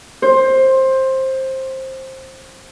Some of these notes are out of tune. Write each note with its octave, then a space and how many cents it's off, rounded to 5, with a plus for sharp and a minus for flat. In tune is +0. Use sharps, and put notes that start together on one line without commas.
C5 +15